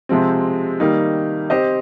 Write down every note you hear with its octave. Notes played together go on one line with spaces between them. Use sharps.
C3 F3 G#3 C4
D#3 G3 A#3 D#4
C4 G4 C5 D#5